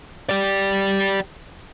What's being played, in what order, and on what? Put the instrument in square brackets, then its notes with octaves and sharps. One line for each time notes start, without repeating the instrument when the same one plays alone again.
[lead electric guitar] G4 D5